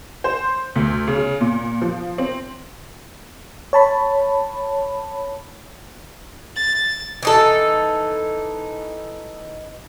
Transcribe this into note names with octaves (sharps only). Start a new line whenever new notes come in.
C5
D2
C#3
A#2
F3
C4
C#5 A5 B5
A6
E3 D#4 A4